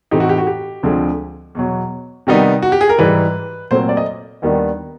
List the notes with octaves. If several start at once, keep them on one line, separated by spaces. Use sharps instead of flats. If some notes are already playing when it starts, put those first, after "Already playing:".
A2 E3 A3 C4 D#4 G4
F#4
G4
F#4
G4
D2 D3 F3 G#3 C4
E2 B2 F#3
C3 D#3 G3 B3 D#4
F#4
G4
G#4
A#4
G#2 E3 G3 B4
A#2 F#3 A3 C4 C5
D5
D#5
D#2 D#3 G3 B3 D4